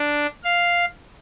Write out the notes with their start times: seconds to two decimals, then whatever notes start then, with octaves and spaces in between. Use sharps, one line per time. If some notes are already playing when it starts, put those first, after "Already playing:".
Already playing: D4
0.44 F5